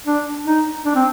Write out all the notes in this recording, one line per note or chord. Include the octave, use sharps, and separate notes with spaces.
D4
D#4
D4
C4